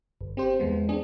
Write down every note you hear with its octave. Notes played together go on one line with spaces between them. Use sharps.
G1
C4 G4 C5
E2 G#3 B3
C4 D4 G#4